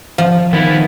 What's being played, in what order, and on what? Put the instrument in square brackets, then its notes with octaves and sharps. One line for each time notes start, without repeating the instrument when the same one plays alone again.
[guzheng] F3 [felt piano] F5
[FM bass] D#3 [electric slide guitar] B3 E4